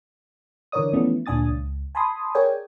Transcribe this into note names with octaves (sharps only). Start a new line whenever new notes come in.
D3 E3 A#4 C#5 D5 D#6
E3 F3 A3 B3 C#4 E4
D2 A#2 D4 G#5 D#6 A6
C#2
G#5 A5 B5 C6 D#6
G#4 A#4 C#5 D5 G5 G#5